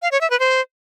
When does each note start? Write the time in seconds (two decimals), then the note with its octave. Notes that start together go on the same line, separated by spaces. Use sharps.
0.02 F5
0.12 C#5
0.21 E5
0.30 B4
0.40 C5